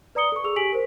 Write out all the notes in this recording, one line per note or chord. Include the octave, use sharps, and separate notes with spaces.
B4 D5 A#5 D#6 C#7 G7
A4 C#6
G#4 C#6 E6 F7
G4 G#5 B6 D7 F#7
A#4 C5